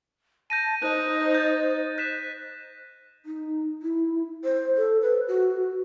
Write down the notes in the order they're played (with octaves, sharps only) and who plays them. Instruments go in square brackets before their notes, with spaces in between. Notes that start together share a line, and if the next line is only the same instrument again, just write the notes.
[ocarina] A5 [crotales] G6 A#6 D#7
[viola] D#4 [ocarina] C5 [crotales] F#6
[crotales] G6 A6
F#6 B6 E7
[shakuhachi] D#4
E4
C5
A4
B4
F#4